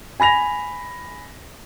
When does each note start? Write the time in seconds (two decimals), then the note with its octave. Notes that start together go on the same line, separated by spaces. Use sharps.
0.20 G#5 B5 A#6 F7